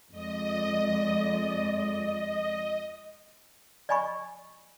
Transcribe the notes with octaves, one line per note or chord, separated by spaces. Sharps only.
F2 G#3 D5 D#5
D5 D#5 G#5 B5 C#6